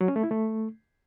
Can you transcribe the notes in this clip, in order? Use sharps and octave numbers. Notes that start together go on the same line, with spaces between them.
F#3
C#4
A3
E4
A3